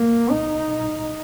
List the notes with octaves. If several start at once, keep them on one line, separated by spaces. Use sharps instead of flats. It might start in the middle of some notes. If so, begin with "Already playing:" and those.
Already playing: A#3
D#4